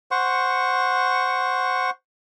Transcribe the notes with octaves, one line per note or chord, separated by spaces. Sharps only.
C5 F#5 C#6